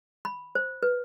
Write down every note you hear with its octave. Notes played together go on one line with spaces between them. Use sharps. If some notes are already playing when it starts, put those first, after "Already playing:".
B5
C5
B4